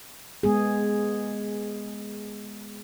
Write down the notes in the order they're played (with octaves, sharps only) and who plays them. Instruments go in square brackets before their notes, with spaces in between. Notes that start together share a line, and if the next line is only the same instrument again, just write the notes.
[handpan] G#3 B3 G#4